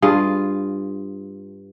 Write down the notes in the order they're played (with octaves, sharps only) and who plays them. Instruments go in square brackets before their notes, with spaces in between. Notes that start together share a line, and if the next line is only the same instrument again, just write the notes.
[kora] G2 F4 G#4